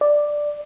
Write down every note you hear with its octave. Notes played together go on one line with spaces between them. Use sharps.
D5